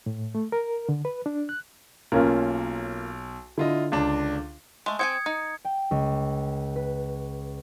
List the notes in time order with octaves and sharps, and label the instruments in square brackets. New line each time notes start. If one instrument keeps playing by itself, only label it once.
[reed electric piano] A2
A3
A#4
D3
B4
D4
F#6
[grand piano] B1 [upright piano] A#3 C#4 F4
[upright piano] D3 [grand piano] E4 F4 D#5
[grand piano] C#2 D4
[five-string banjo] G#3 A3
[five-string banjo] C4 G5 G#5 [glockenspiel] D#6 G#6 C#7
[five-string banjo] D#4
[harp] G5
C#2
B4